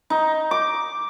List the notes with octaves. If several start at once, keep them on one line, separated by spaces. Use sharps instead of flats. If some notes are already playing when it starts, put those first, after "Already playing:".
D#4
D6